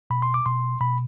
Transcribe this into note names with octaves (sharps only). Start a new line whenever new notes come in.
B2 B5
C6
D6
B2 C6
B2 B5